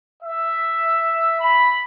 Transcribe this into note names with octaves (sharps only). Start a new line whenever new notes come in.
E5
B5